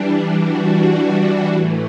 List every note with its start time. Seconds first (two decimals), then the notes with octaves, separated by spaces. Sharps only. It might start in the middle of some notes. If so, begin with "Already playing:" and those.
Already playing: E3 G3 D4
0.34 E3 G3 D4 F#4
1.51 A2 E3 A3